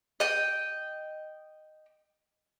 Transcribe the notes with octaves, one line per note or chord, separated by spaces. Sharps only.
D#5 G5